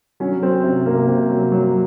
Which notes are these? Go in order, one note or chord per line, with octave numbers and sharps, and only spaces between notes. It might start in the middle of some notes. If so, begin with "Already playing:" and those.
F#3 C#4
F#3 C4
C3
C3 A#3
C3
F#3
F#3